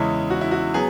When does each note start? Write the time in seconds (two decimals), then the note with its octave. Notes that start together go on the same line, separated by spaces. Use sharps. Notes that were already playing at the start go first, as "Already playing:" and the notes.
Already playing: E2 C#3 G#3 C#4 E4
0.30 F#4
0.41 E4
0.51 F#4
0.74 F#3 B3 G#4